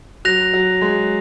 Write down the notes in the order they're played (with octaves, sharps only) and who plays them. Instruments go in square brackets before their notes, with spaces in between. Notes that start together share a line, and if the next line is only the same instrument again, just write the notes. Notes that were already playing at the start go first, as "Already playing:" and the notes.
[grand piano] F#3 [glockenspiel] F#6 A#6 F7
[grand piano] F#3
G#3